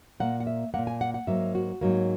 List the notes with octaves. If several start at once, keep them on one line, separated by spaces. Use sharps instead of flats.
A#2 A#3 F#5
F#5
E5
A#2 A#3 F#5
G#5
F#5
F#5
G#2 F#3 A#3 E5
F#4
G#2 F#3 A#3